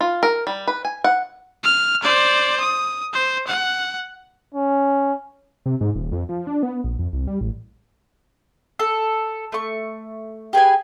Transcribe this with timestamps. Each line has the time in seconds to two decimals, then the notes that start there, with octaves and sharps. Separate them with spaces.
0.01 F4
0.23 A#4
0.47 G3
0.67 B4
0.85 G#5
1.04 F#5
1.64 F6
2.03 C5 D5
2.60 D#6
3.13 C5
3.47 F#5
4.54 C#4
5.66 C3
5.81 G#2
5.95 D#1
6.12 F2
6.29 F3
6.47 D4
6.63 B3
6.84 A#1
6.99 F2
7.13 C2
7.27 G3
7.41 A1
8.79 A4
9.52 A3 C#6
10.53 G4 G#4 B4 G#5